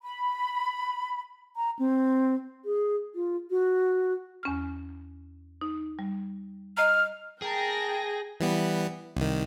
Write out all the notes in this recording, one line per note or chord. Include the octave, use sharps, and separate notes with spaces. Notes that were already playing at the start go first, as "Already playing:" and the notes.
B5
A#5
C4
G#4
F4
F#4
E2 C#4 F6
D#4
G3
D#5 A#5 F6
G#4 A#4 G5 A5 A#6
E3 G3 B3
C2 D#3